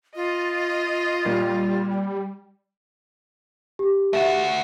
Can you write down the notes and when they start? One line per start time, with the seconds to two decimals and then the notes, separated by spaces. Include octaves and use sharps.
0.16 F4 D#5
1.25 A#2 G3
3.79 G4
4.13 A3 F#4 E5 E7